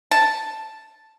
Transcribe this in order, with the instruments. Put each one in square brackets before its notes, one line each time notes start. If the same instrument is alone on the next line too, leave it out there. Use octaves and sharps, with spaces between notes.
[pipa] A5